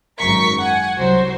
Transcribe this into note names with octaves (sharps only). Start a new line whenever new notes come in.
G#1 F#2 A#4 C#6 B6
F#5 G#5
C2 F#3 F#4 C5